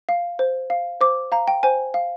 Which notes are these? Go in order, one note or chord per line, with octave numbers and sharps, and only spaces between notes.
F5
C5
F5
C5 D6
F5 A#5
G5
C5 G#5
F5